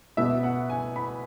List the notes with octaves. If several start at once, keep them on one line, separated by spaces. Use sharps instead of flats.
B2 E5
F#5
G#5
B5